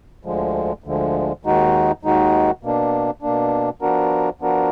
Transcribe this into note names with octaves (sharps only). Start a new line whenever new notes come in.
D2 D3 F3 G#3
D2 D3 F3 G#3
D#2 D#3 G#3 D#4 F#4
D#2 D#3 G#3 D#4 F#4
B2 A#3 D4
B2 A#3 D4
F3 B3 D4 F#4 A#4
F3 B3 D4 F#4 A#4